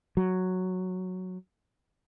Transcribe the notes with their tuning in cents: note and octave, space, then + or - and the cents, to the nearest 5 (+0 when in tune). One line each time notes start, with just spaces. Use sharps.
F#3 -5